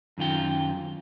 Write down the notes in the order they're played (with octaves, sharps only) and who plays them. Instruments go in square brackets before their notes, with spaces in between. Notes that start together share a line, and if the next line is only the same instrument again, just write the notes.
[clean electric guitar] F#2 D#3 F4 G5